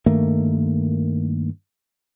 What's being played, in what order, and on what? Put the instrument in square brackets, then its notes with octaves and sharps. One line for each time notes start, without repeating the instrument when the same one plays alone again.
[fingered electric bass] G2 D#3 A3 A#3